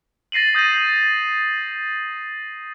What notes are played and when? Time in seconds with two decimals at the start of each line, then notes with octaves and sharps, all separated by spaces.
0.32 A6 A#6 C7 D#7 F#7
0.55 D#6 G6 A6 A#6 D#7